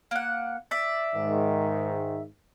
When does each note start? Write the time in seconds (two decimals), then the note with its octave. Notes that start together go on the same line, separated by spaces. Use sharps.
0.11 A#3 F#5
0.71 D5 E5
1.16 G#2 D#3